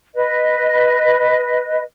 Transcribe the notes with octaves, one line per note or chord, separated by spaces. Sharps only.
B4 D#5